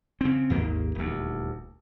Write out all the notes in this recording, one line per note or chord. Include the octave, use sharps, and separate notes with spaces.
C#3 C4
G#1 D#2 A#3
D#1 D2